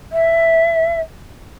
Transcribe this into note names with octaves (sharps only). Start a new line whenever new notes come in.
E5